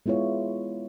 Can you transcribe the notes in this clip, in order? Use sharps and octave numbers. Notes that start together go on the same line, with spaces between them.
G#3 B3 E4 F4 C#5